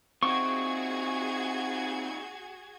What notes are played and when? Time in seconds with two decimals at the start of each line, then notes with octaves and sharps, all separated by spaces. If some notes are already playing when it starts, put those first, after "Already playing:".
0.23 C4 D#4 F4 F#4 G#4 C#6 G#6